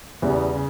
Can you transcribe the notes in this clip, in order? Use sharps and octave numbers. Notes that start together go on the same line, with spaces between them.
E2 C#3 E3 G3 B3
C#3